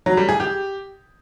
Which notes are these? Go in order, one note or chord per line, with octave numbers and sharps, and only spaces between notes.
F#3
G3
G#4
G4